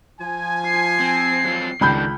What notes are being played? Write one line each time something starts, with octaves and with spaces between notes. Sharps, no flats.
F3 G#5
C7
C4
F#3 C4 F4
C#2 D#3 D4 B5 G6